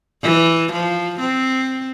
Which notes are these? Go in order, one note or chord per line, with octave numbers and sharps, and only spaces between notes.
E3
F3
C4